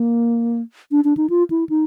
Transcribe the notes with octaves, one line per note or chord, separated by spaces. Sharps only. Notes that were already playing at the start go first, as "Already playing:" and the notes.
Already playing: A#3
D4
D4
D#4
F4
E4
D#4